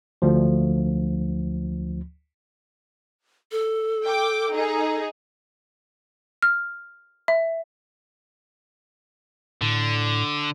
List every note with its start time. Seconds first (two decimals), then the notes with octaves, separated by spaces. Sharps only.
0.22 D2 F3
3.52 A4
4.05 G5 D6
4.55 D#4 G#4
6.42 F6
7.28 E5
9.61 A2 D3